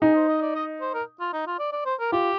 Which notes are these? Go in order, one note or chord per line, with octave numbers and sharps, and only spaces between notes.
D#4 G#4
C5
D#5
D5
D#5
C5
A#4
F4
D#4
F4
D5
D5
C5
A#4
F4 G4